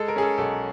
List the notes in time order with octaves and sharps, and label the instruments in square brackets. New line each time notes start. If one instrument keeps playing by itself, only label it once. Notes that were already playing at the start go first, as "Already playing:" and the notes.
Already playing: [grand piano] G#3 A4
A#4
C#4 G#4
A4
B1 A4